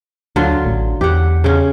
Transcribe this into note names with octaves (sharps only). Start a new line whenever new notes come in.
D2 D3 F#3 F4
A1
E2 G4 F#5
C#3 C#4